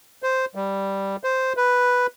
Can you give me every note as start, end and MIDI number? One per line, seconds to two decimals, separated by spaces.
0.23 0.45 72
0.55 1.16 55
1.24 1.53 72
1.57 2.07 71